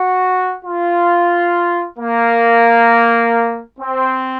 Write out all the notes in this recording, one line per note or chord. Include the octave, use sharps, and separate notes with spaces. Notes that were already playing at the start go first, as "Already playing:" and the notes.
Already playing: F#4
F4
A#3
C4